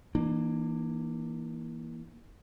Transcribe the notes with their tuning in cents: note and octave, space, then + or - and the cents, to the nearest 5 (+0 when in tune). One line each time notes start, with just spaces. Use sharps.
E3 -10 A#3 +15 D4 +45